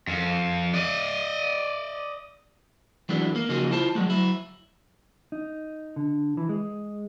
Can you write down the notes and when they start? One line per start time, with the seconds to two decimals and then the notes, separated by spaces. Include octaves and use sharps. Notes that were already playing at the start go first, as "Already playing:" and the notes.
0.08 F2
0.74 D5 D#5
3.09 E3 F#3 G#3 A3 B3 D4
3.36 A#3
3.49 C#3 F3 A#3 D#4 F#4 G#4
3.71 E4 F4 C5 A5
3.95 F#3 G#3 A3
4.06 F#3 E4
5.32 D#4
5.96 D3
6.37 E3
6.49 G#3